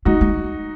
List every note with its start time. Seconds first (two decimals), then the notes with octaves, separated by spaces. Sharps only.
0.05 G#3 D#4 F#4
0.21 G#3